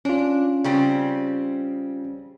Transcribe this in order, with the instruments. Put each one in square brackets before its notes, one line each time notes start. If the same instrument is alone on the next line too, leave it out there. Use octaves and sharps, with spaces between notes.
[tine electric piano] C#4 F4 [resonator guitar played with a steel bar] D4
[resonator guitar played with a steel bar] C#3 G3 C4